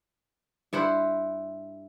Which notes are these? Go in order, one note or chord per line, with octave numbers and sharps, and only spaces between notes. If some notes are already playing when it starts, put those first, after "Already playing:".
G2 E4 C5 F#5